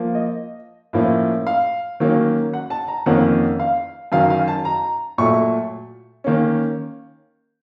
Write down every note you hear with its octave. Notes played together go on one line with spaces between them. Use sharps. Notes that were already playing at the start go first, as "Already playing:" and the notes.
Already playing: F3 A#3
D#5
A2 F3 A#3 C#4
F5
D#3 F#3 A#3 C#4
F#5
A5
A#5
F2 D#3 A#3 C#4 F#5
F5
F#2 D#3 F#3 F5
F5
A5
A#5
A#2 F#3 A3 C#6
D#3 A#3 C#4